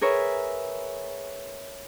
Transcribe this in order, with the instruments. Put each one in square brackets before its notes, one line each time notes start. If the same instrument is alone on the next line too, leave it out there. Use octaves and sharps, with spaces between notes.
[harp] G#4 A#4 B4 C#5 E5